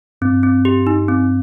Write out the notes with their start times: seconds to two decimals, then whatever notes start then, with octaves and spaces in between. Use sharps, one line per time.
0.21 G2 C4
0.43 C4
0.65 G4
0.87 D#4
1.08 C4